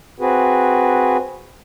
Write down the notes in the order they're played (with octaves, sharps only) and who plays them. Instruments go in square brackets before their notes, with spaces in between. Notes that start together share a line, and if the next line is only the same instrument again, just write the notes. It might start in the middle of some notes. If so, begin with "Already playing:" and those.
[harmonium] C4 F#4 G#4 B4